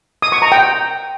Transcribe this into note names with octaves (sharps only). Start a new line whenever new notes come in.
D#6
C#6
A#5
G5